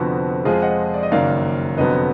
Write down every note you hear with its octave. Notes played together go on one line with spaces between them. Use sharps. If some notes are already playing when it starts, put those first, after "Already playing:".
Already playing: F1 F2 D3 F3 B3 F#4
F2 F3 G#3 F4 G#4
D#5 F#5
D5
D#5
F#1 F#2 D#3 A#3 D5 F5
F1 F2 D3 F#3 B3 B4 D#5